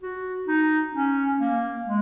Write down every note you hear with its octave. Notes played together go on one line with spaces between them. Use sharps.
F#4
D#4
C#4
A#3
G#3